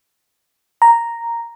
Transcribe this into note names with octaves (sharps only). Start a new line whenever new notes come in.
A#5